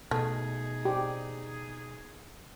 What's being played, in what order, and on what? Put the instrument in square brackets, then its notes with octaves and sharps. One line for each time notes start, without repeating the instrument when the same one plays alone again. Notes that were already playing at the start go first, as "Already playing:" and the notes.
[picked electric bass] B2 [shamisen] A3 [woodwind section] D#4 G#4
[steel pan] G4